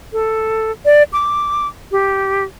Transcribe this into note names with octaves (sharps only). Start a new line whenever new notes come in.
A4
D5
D6
G4